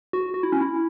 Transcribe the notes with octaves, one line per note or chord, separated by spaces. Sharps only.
F#4
F#4
E4
C#4
E4